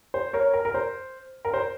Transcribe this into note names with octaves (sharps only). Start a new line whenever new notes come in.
C5
A#4 C#5
A#4
A#4
C5
A#4
C5